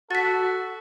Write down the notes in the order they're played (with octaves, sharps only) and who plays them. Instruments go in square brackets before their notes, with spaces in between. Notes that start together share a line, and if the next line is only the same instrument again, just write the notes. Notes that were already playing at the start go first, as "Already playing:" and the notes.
[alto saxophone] F#4 [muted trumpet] A4 [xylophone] A6 B6